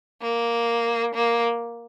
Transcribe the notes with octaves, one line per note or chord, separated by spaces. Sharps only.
A#3
A#3